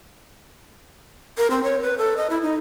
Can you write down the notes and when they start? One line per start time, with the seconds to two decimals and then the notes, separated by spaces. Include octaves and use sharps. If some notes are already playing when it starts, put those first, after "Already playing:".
1.38 A#4
1.50 C4
1.63 C#5
1.82 B4
1.98 A4
2.17 D#5
2.30 E4
2.42 D#4